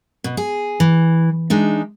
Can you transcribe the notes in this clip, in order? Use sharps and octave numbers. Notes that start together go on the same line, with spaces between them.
B2
G#4
E3
G#3 D4 D#4 E5